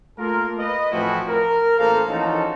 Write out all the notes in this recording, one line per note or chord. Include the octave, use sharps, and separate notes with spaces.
A3 A#3 F4 A4 A#4
B4 D#5
A2 E3 F3 C4 E4 F#4
A#4
A1 A#3 A4 C5 F5 A#5
E3 F3 C#4 D#4 F#4 A4